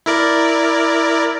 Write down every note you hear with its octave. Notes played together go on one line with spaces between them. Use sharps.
E4 A#4 D5